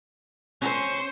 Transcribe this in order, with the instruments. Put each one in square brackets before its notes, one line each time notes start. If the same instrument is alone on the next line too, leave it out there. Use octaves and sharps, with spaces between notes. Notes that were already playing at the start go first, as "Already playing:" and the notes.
[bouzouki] C#4 [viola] C5